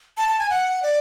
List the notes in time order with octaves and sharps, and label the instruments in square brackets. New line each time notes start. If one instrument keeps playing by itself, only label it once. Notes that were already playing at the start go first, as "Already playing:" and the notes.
[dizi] A5
A5
G#5
F#5
D5